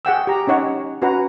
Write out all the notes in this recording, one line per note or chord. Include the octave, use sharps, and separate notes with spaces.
G#4 F#5 G5 E6
G4 A#5
C#4 D#4 C#5 F#5
C#4 F#4 B4 F#5 A#5